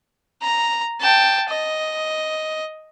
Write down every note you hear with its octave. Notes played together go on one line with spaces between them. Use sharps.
A#5
G5 A5
D#5